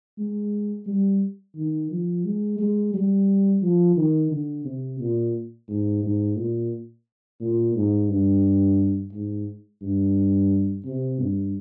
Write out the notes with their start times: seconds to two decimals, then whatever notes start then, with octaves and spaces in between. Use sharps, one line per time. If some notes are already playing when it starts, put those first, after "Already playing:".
0.18 G#3
0.86 G3
1.56 D#3
1.91 F3
2.24 G#3
2.59 G#3
2.93 G3
3.62 F3
3.96 D#3
4.31 D3
4.65 C3
5.00 A#2
5.69 G#2
6.03 G#2
6.37 A#2
7.40 A#2
7.75 G#2
8.09 G2
9.13 G#2
9.82 G2
10.85 C3
11.19 G2